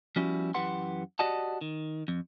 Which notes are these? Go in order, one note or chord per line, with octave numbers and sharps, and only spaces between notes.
F3 G3 B3 C#4 E4 F#4
F#2 E3 G4 B4 F#5 C6
F#4 G4 D5 D#5 F#5 A5
D#3
F2